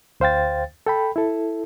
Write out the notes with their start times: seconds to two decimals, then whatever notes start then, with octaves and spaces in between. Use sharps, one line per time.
0.20 D2 C5 F5 G5 A6
0.87 A4 G5 B5
1.16 E4 A4